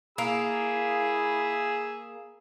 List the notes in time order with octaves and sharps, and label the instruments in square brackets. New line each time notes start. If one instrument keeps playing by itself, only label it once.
[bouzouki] A#3 [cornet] G#4 [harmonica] B5 E6